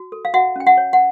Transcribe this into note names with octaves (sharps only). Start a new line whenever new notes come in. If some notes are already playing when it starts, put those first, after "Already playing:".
Already playing: F#4
A4
F5
F#4 E5 F#5
C#4 G5
E5 F#5
C#5
F#5